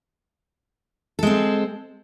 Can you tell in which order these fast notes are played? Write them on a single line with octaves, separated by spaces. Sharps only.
A4 G#3 C4